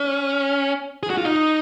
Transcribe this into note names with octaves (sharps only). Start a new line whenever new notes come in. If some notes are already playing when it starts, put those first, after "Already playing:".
Already playing: C#4
G#4
F#4
F4
D#4